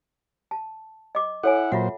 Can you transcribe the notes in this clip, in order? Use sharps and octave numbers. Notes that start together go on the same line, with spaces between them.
A5
D#5 D6
E4 A4 C#5 F#5 G#5
A#2 F#3 F4 C5 E5 F#5